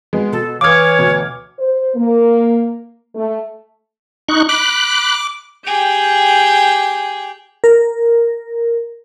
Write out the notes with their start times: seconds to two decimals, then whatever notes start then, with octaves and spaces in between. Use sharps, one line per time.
0.13 G#3 B3
0.32 B2 A4
0.61 E3 C#5 F5 D6 D#6 F6 G#6
0.99 D2 B2
1.59 C5
1.95 A#3
3.15 A3
4.28 D#4 C#6 F#6
4.49 B5 D6 F#6
5.66 G4 G#4 G5
7.64 A#4